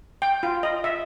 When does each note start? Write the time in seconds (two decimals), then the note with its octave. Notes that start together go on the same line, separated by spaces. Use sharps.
0.22 G5
0.43 F4
0.63 D#5
0.84 E5